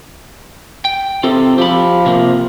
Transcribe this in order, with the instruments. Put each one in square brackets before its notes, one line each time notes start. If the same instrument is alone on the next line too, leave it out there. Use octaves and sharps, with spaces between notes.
[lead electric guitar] G5
[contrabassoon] C3 [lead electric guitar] F4 A4
[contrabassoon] F3 [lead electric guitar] G4 B5
[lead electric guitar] C3 A#3